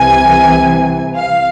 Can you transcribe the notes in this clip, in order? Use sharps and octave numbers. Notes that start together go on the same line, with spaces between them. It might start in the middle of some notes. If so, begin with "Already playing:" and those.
Already playing: C2 C3 E3 G#5
F5